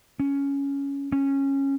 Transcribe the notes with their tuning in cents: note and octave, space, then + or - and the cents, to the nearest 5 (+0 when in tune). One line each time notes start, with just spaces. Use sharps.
C#4 +10
C#4 -10